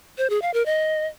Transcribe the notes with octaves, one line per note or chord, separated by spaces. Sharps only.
C5
G#4
F5
A#4
D#5